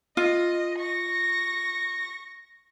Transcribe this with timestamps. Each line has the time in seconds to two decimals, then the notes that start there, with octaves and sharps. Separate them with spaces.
0.17 F4 D#5
0.79 C#6 A#6